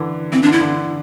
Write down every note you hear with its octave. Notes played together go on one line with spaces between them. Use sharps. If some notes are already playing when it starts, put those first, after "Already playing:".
Already playing: D3 E3
E3 C4
D4
D3
E4
D3